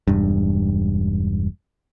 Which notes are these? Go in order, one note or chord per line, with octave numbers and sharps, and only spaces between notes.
E1 G2